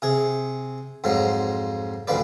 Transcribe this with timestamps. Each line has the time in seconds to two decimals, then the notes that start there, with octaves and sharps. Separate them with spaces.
0.02 C3 G#4
1.04 F2 G#2 F3 F#3
2.08 A1 D2 F3 B4 D5